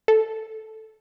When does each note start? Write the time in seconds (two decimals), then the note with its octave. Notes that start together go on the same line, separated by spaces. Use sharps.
0.08 A4